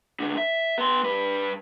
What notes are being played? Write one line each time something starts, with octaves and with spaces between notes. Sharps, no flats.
C#2 D3
E5
B3 C6
G2 B4